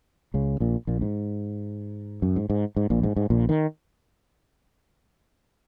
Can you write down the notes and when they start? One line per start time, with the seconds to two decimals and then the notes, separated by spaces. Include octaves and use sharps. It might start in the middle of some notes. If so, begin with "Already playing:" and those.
0.34 C#2 C#3
0.60 A#1 A#2
0.87 A#1 A#2
1.02 G#2
2.22 F#2
2.36 G#2
2.50 G#2
2.76 G#2
2.90 A#1 A#2
3.03 G#2
3.16 G#2
3.30 A#1 A#2
3.49 D#3